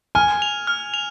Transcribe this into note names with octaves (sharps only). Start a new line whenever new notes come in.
G#5 F6
F7
F6
F7